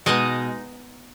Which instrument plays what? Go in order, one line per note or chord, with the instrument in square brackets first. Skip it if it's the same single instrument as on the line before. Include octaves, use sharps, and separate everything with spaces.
[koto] B2 G#3 D#4 D#5